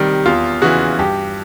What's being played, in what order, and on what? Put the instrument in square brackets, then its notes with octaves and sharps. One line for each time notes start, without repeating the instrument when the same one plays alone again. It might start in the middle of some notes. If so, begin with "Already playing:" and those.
Already playing: [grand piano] C3 D#3 G3
E2 F4
C#3 E3 F#4
G2 G4